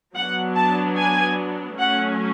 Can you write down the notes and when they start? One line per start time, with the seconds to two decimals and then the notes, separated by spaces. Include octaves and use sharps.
0.15 F#3 B3 D4 F#5
0.56 A5
0.97 G#5
1.79 F#3 A3 C#4 F#5